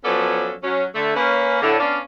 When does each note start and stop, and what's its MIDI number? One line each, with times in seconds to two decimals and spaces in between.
0.05 0.54 53
0.05 0.54 54
0.05 0.54 59
0.05 0.54 61
0.05 0.54 69
0.05 0.54 74
0.63 0.85 54
0.63 0.85 61
0.95 1.13 50
0.95 1.13 57
1.15 1.62 58
1.15 1.62 61
1.15 1.62 71
1.62 1.79 45
1.62 1.79 50
1.80 2.00 59
1.80 2.00 61
1.80 2.00 62
1.80 2.00 74
1.80 2.00 77